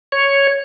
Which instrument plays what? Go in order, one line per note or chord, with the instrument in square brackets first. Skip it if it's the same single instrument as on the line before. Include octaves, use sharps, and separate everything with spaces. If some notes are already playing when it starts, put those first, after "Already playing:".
[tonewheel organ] C#5